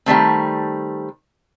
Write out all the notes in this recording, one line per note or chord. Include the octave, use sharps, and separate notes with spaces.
D#3 G3 A3 C4